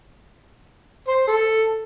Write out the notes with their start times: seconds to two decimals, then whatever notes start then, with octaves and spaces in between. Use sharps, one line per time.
1.08 C5
1.28 A4